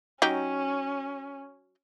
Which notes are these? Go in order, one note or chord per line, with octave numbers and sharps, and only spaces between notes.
F#3 C#4 D#4 G4